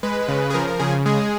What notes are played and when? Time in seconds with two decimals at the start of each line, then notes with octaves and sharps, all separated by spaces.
0.03 G#3 B4
0.28 C#3
0.50 G#4
0.54 F3 A#4
0.67 A#4
0.79 C#3 G#4
1.06 G#3 G#4